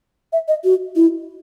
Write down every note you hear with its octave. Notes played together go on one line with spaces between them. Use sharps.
E5
D#5
F#4
E4